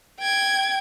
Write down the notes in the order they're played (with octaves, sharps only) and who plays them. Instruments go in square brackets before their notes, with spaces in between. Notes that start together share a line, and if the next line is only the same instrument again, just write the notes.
[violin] G5 G#6